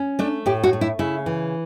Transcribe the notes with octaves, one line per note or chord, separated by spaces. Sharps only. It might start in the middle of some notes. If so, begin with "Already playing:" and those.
Already playing: C#4
A3 D4
A2 G4
F#4
A3
E4
C#3 E4
E3